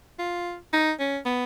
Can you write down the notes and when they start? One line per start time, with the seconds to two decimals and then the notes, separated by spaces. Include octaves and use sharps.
0.19 F4
0.73 D#4
1.00 C#4
1.25 B3